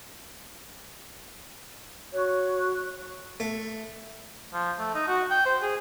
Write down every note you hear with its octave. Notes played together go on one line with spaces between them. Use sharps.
F#4 C#5
A3
F3
A3
D#4
F#4
G5
C5
G#4